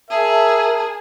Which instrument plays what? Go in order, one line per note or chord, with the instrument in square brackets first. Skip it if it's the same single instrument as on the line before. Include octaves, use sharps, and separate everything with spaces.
[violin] G#4 [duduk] A#4 [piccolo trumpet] E5 [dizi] A5